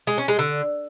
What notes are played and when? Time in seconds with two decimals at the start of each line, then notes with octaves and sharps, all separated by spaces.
0.07 G#3
0.18 C#4
0.28 G#3
0.39 D3